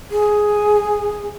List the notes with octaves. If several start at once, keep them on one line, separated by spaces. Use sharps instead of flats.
G#4